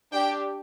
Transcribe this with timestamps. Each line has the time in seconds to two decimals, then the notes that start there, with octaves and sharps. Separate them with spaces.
0.12 D4 G4 G5